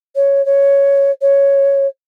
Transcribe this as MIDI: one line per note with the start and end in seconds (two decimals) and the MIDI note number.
0.15 0.44 73
0.45 1.10 73
1.21 1.87 73